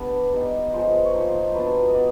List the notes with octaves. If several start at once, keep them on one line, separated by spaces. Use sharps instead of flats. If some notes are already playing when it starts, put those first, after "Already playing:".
Already playing: G3 B3 D4
G3 B3 D#4
F3 G#3 B3 C5
C#5
F3 A#3 D#4 C5
F#3 B3 D4 F4 B4
D#5
B3 D5